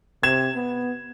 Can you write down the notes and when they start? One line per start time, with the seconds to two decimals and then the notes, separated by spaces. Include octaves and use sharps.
0.23 C3 G#6 E7
0.56 B3